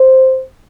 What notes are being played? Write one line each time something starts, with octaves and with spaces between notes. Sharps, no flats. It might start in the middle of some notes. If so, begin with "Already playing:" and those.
Already playing: C5